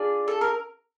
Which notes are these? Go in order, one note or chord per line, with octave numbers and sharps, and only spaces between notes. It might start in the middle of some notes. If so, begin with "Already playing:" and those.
Already playing: D4 F4 G#4 D5
A4
A#4